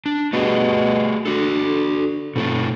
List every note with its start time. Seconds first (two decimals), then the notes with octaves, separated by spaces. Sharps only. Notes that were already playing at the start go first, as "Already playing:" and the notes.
0.06 D4
0.33 B2 A3 G4 G#4
1.25 D3 F#4 A4
2.36 F1 B2 A3